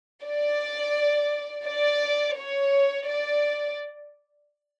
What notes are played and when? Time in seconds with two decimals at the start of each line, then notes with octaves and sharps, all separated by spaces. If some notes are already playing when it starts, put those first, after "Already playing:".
0.24 D5
1.66 D5
2.37 C#5
3.08 D5